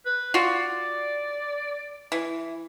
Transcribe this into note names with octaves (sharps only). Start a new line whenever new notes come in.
B4
F4 F#4 D5
E3